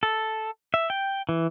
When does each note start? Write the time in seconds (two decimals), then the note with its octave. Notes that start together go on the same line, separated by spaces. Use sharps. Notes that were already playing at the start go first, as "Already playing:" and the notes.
0.03 A4
0.74 E5
0.90 G5
1.29 E3